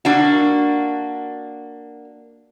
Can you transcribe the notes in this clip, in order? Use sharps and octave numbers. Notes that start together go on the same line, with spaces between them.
A#3 D4 F#4